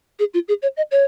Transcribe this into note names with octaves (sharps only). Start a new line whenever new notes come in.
G#4
F4
G#4
C#5
D#5
C#5